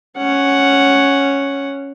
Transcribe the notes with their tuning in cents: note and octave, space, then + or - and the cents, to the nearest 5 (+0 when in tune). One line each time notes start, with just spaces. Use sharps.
C#4 +0 F#5 +0